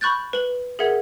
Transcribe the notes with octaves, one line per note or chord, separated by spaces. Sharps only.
B5 C#6 F#6 G6 A6
B4 F#7
G#4 A#4 E5 F#5 G#6